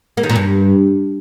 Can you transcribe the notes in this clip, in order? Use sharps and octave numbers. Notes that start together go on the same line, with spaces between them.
A#3
D#3
A#2
G2